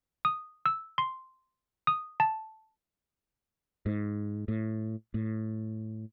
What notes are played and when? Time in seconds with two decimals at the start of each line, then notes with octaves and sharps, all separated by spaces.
0.25 D#6
0.66 E6
0.98 C6
1.87 D#6
2.20 A5
3.86 G#2
4.48 A2
5.14 A2